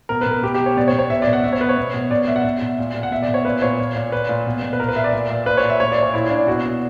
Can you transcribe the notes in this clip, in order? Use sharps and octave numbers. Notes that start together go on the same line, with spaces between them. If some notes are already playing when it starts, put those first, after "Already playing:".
B2 A#4
B4
B2 A#4
B2 G4
G4
B2
C#5
B2 D5
C#5
B2
C#5
B2 E5
D5
B2
F#5
B2 E5
C#5
B2 B4
C#5
B2
B2
B2 D5
B2 E5
F#5
B2 E5
B2
A#2
A#2
F#5
B2 E5
D5
B2
C#5
A#2 B4
A#2 C#5
A#2
A#2
A#2 B4
A#2
B2
B2
B4
A#2 A#4
B4
A#2 E5
D5
A#2
A#2
A#2 B4
C#5
A#2
E5
A#2 C#5
D5
A#2
C#5
A#2 E4
A#2 D4
B2 F#4
B2